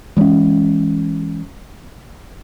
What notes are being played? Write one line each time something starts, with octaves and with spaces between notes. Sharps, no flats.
E3 G#3 C#4